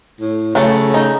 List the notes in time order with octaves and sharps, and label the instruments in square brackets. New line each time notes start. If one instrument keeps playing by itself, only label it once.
[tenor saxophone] A2
[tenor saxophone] C#3 [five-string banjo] F#3 A4 [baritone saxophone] A3
[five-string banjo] D#4